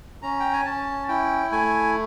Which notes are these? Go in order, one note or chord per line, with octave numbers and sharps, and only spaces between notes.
C#4 A#5
G5
G#5
C#4 A5
E4 G5
A3 G#5